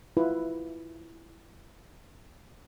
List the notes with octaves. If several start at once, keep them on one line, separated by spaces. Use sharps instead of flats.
E4 F4 B4